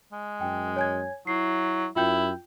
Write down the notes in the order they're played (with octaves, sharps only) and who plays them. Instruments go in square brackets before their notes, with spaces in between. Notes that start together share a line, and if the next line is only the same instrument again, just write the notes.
[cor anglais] G#3
[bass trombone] F#2 [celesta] G5
[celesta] C#5 G#5 G#6
[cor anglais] F#3 [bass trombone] E4 [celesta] C7
[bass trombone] F#2 [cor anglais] E4 [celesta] F4 G5 G6